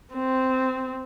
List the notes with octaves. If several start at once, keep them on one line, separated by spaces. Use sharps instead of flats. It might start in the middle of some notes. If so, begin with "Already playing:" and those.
C4